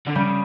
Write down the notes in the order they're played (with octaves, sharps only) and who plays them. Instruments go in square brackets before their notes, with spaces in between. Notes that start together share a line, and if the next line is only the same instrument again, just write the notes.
[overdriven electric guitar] D3
[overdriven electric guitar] C#3 [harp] G3